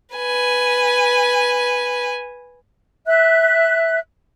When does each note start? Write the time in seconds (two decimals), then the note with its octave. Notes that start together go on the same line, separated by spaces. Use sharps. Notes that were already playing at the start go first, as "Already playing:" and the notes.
0.16 B4 G#5
3.07 E5 F#6